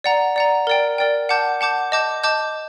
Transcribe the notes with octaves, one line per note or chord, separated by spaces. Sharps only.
D5 F#5 A#5
D5 F#5 A#5
A#4 D5 G5
A#4 D5 G5
F#5 A5 D6 G6
F#5 A5 D6 G6
D#5 A5 D6 G6
D#5 A5 D6 G6